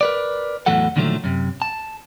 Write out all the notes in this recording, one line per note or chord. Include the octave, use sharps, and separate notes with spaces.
A#4 B4 D5
E2 A2 E3 F#3 A4 F#5
A#2 D3 D#3 F3 F#3 A3
F#2 C3
A5